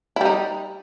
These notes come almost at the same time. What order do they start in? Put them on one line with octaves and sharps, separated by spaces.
E4 G3 D#4